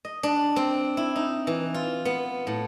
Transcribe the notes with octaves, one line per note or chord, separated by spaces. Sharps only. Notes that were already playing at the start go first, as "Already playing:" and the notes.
D#5
D4
C4
E4
D#4
E3
F4
B3
A2